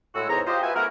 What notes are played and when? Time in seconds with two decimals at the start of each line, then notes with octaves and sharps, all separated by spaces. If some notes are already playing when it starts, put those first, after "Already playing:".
0.15 A2 G#3 F#4 E6
0.29 E2 G#2 G#4 C5 C#5 A#5
0.46 F4 G4 C5 D#5
0.62 F4 F#4 B4 E5 G#5
0.75 A3 B3 C#4 E4 F#4 A#4